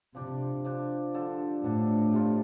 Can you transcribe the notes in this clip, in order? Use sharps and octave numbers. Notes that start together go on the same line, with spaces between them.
C3 F3 D4 G4
F3 D4 G4
D3 F3 D4 A4
A2 D3 F3 D4 A4
C3 G3 F4 A4